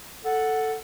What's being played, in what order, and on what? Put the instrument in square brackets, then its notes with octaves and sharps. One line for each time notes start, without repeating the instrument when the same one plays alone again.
[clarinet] A4 [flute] F#5